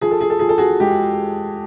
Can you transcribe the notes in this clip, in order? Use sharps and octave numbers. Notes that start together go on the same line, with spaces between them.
F3 G#4
A4
G#4
A4
F3 G#4
A4
F#4 G#4
G#3 G4